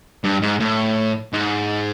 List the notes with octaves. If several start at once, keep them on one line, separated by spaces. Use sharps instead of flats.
G2
G#2
A2
G#2